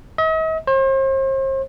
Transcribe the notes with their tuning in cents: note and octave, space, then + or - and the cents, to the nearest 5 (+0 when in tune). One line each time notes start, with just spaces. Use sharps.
D#5 +45
C5 +40